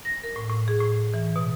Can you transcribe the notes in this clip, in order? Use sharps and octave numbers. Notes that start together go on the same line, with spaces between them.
A#6
A#4
A2
A2
G#4
A2
E3
B2